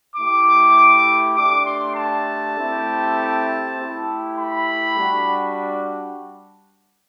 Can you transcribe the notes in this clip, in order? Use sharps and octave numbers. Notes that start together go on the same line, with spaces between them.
A3 E4 G4 D6
A3 D4 G4 D6
C6
A5
A3 C4 E4 G4
A3 E4 G4
B5
G3 D4 F#4